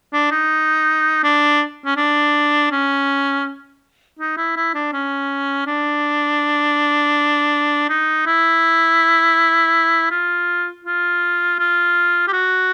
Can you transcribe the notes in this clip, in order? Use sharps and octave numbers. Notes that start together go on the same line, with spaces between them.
D4
D#4
D4
C#4
D4
C#4
D#4
E4
E4
D4
C#4
D4
D#4
E4
F4
F4
F4
G4
F#4